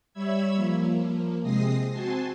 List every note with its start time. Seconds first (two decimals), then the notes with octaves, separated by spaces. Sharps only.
0.13 G3 C#5 E5 B5 E6 G#6
0.55 F3 A#3
1.42 C3 G#3 C4 D#6 A#6 C7
1.92 C4 F#4 G#5 A5 C6